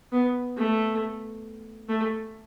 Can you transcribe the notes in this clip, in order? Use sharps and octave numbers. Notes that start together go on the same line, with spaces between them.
B3
A3
A3